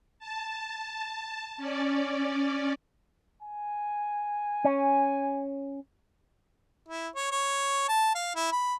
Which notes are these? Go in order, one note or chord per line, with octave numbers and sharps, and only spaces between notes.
A5
C#4 D5
G#5
C#4
E4
C#5
C#5
A5
F5
E4
B5